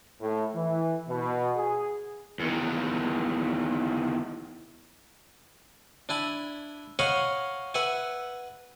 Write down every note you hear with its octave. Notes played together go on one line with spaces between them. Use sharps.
A2
E3
B2
G#4
E2 D#3
D4 E4 G#5 B5
C#5 D#5 F5 F#5 G#5 B5
B4 E5 F#5 G#5